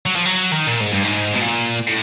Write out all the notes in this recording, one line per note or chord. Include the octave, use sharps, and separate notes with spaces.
F#3
F3
F#3
D#3
A#2
G#2
G2
G#2
B2
A#2
A2